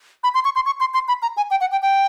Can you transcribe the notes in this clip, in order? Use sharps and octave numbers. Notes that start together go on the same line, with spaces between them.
B5
C6
C#6
C6
C#6
C6
C6
B5
A#5
G#5
G5
F#5
G5
G5